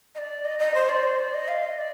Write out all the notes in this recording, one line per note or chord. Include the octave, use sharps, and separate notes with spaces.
D#5
D5
D#5
D#5
C5
D5
C5
D5
D#5
F5
D#5
D5